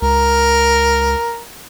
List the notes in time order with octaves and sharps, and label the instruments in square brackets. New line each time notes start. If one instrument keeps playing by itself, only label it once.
[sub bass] C#2 [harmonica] A#4